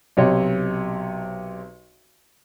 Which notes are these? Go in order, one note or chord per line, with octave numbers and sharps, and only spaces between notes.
B1 C3 C#5 D#5